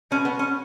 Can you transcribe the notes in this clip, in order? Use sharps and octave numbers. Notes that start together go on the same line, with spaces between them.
B2 G#3 B3 C#4
B3
C#4